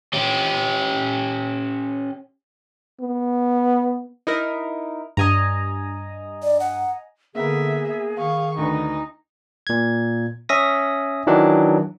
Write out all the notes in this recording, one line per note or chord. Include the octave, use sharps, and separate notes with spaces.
C#4 G4
B3
D#4 E4 A#4
G2 D#5 G#5 A#5
D5
F#5
D3 A#3 B3 G#4 A#4 E5
D#3 F5 C#6
D2 D#4 B4
A#2 G#6
C#4 E5 D#6 A#6
D#3 E3 F#3 D4